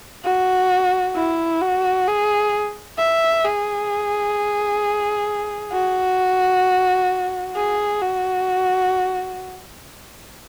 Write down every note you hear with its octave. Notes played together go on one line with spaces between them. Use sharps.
F#4
E4
F#4
G#4
E5
G#4
F#4
G#4
F#4